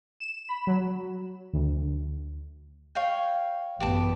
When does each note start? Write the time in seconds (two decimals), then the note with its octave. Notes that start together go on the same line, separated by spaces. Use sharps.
0.20 E7
0.49 B5
0.67 F#3
1.53 D2
2.95 C#5 F5 G5
3.80 A1 F#2 B3 G4 D5 A5